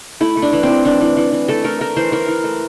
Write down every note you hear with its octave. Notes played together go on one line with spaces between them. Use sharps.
A3 E4
A3
D4
E3
C4
E3
E3 D4
E3
E3
E3
A3 A4
A3 A#4
A3 A#4
E3 C5
E3 A#4
E3
A3